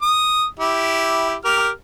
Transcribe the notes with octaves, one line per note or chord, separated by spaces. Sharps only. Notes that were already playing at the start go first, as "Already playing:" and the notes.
D#6
E4 G4
G4 A#4 F6